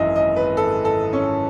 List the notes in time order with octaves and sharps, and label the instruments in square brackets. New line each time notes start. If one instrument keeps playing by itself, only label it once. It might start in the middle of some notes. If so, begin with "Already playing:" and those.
Already playing: [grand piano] G#1 F#2 E3 D#5 E5
D#5
B4
A4
A4
C#4